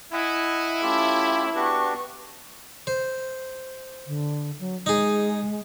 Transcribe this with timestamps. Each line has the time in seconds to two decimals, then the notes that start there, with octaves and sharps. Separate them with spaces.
0.13 E4 D#5 F#5 G#5
0.82 A3 C#4 F4 G4
1.55 B3 D4 F#4 G4 C#6
2.87 C5
4.07 D3
4.60 F#3
4.86 G#3 D#4 G#4